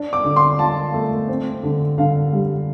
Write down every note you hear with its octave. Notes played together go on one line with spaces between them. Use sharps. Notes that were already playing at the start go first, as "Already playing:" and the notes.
Already playing: D4
D6
D3
C6
F4 A5
A3
C4
D3
D3 F5
G3